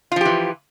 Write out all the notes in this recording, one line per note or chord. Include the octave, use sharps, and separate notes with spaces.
E3 F3 F4 G4